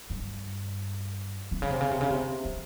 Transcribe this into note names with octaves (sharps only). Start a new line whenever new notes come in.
G2
C3
C#3
C3
C#3
C3
C#3
C3
C#3